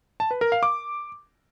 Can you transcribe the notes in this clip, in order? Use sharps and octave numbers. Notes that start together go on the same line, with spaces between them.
A5
B4
A#4
F5
D6